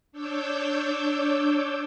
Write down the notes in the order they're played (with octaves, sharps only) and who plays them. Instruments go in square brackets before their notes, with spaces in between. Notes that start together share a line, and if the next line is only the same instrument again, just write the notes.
[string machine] D4 C#5 D6 E6 G6